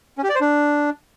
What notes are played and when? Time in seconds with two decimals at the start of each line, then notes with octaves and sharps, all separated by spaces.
0.18 C#4
0.24 G4
0.29 D5
0.35 C5
0.41 D4